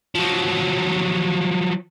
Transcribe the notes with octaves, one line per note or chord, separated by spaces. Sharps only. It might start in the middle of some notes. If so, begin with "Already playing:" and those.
F3 F#3